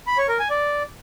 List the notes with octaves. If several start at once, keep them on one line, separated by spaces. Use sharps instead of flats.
B5
C#5
A#4
G#5
D5